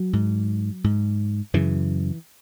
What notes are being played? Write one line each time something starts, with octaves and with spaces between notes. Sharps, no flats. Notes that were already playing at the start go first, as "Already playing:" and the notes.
Already playing: F#3
G#2
G#2
F#2 C#3 E3